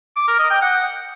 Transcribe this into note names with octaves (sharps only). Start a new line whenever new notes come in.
D6
A#4
D#5
G5
F#5